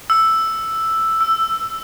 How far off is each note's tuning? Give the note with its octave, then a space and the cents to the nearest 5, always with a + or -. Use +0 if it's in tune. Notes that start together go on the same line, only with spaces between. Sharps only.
E6 +0
E6 +15